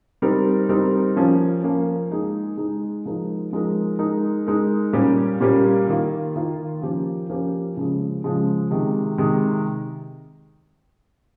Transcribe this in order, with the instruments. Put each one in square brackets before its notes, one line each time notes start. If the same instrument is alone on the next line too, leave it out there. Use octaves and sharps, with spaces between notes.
[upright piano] G3 C4 D#4 A#4
G3 C4 D#4 A#4
F3 A#3 C#4
F3 A#3 C#4
G#3 D#4 G#4
G#3 D#4 G#4
F3 G#3 D#4 A#4
F3 G#3 D#4 A#4
G#3 D#4 A#4
G#3 D#4 A#4
A#2 G3 A#3 C#4 G4
A#2 G3 A#3 C#4 G4
D#3 A#3 F4
D#3 A#3 F4
F3 A#3 C#4 G4
F3 A#3 C#4 G4
C#3 F3 G#3
C#3 F3 G#3
C3 D#3 G#3
C3 D#3 G#3